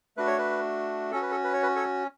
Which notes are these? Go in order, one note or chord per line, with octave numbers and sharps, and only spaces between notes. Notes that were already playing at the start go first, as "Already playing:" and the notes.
A3 D4 F#4 B4
C#5
B4
C#4 F#4 A4
B4
A4
B4
C#5
B4
A4 C#5